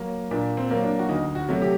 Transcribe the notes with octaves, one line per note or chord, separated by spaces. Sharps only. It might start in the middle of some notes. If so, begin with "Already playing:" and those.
Already playing: F#3 A#3
A#2 D4
C4
F#3 A#3
D4
F#4
D2 D#4
F#4
C3 F#3 A3
G4